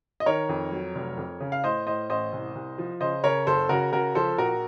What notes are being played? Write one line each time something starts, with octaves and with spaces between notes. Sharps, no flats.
D#5
D#3 A#4 C#5
F2
F#3
F1
F2
C#3
F5
A2 C5 D#5
A2 C5 D#5
A1 C5 D#5
C2
C2
F3
C#3 C5 D#5
C#3 A#4 C#5
F#1 A4 C5
C#3 F#4 A#4
C#3 F#4 A#4
F3 A4 C5
A#1 F#4 A#4